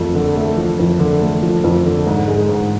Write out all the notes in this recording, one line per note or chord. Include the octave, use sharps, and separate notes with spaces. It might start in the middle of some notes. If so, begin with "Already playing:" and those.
Already playing: F2 F3 A3
D3
A3
F3
F2
D3
A3
F3
F2
D3
G#2
G#3
G#2